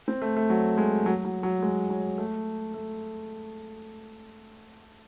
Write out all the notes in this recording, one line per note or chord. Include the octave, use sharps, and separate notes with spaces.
C4
A3
A3
F#3
G#3
F#3
F#3
F#3
G#3
F#3
A3
A3